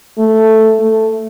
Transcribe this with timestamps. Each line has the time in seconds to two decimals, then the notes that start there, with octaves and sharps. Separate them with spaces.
0.18 A3
0.80 A3